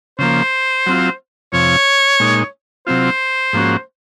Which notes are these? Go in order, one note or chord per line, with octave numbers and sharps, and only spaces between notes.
C#3 F3 A#3 C5
F#3 C4 F4
F2 C3 F3 C#5
A#2 G#3 D#4
C3 F#3 C4 F4 C5
G#2 F3 A#3 C#4 F#4